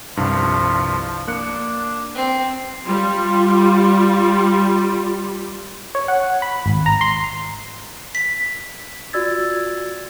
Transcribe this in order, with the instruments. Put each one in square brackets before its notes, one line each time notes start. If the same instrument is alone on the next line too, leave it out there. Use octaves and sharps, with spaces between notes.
[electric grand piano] C2 G2 [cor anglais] F3
[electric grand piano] A#3 F#6 C#7 [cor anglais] D4
[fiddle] C4
[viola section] G3 [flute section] F4 C6
[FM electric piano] C#5
F#5
B5
G#1
A#5
C6
[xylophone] B6
[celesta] F4 F#4 D5 E6 G#6 A6